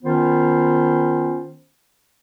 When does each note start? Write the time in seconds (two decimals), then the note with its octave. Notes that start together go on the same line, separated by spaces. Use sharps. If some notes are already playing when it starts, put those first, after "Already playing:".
0.04 D#3 B3 C#4 F4 C5